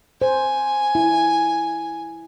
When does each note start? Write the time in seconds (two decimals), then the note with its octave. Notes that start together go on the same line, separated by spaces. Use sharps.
0.22 C5 G#5
0.95 E4